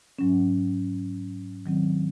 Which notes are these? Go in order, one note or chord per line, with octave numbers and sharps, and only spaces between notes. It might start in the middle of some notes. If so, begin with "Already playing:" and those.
G#2 F#3 C#4
D#3 F#3 C4